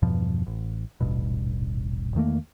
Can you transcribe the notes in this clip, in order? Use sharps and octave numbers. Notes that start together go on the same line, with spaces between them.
E2 G2 B2 F3
A1
D#1 A1 G2 B2
E2 D#3 A3 A#3